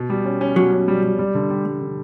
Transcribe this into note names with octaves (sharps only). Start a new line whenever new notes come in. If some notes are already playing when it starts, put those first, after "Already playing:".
Already playing: B2
G3
C#4
C#4
B2 F#3
C#4
G3
G3
G3
D3
G3
G3
D3